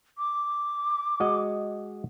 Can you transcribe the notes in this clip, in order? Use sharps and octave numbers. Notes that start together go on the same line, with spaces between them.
D6
G#3 F#4 D#5